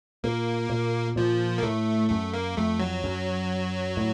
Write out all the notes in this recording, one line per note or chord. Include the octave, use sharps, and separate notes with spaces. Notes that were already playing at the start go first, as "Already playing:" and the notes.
A#2 A#3
A#2
A#2 F3
A#3
A2 A3
F#2 A3
A#3
F2 A3
F#3
F#2
A2